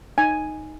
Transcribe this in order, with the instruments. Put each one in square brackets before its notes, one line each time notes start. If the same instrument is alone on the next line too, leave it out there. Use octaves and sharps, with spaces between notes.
[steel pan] D#4 G#5